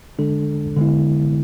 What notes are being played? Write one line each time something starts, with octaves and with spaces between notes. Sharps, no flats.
D3 G#3 D4 A4
D3 G#3 B3 E4